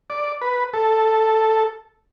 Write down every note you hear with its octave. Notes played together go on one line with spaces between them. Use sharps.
D5
B4
A4